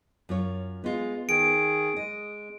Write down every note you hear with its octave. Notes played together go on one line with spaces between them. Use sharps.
F#2 F4 C#5
G#3 B3 F4
D#3 G#4 D7
G#3 D#5